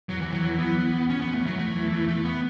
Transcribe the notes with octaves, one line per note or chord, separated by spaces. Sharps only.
E2 F#3
E3
E2
F#3
E3
E2 B3
E2
E2
E2 C#4
E2 B3
A3
E2 F#3
E2 A3
E3
E2
E2 A3
B3